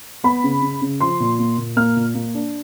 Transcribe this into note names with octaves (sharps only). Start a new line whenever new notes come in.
B3 B5
C#3
C#3
C#3
F3 C6
A#2
A#3
A#2
A#3 F6
A#2
A#3
D4